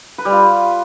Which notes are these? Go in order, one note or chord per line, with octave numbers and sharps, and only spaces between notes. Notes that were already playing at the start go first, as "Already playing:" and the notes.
B4
G3
F4